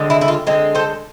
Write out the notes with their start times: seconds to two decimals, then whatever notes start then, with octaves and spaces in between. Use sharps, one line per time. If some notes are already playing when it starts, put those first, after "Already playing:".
Already playing: D3 G#3 C4
0.10 E4
0.21 E4
0.28 F4
0.47 D3 G#3 C4
0.75 A4 C5